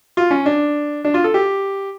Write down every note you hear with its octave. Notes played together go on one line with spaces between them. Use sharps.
F4
C#4
D4
D4
F4
A4
G4